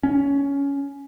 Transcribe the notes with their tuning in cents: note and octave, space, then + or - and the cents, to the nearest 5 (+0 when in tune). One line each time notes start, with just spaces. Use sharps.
C#4 +15